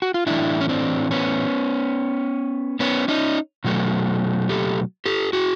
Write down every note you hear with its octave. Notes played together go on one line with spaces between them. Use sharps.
F#4
F4
A2 E3 A3 D4 E4
C#4
C4 D4
B3 C#4
B3 C#4
C#4 D#4
B2 F#3 A3
G4 A4
G4 A4
F#4 G#4